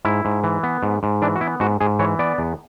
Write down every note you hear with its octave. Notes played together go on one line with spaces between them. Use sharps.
G#2 E4
G#2
E3
B3
G#2
G#2
E3 D4
F#4
B3 E4
G#2 F#4
G#2 G#4
E3 C#5
B3 D5
E2